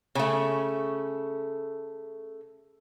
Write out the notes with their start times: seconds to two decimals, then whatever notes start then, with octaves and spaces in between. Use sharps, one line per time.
0.15 C#3 A3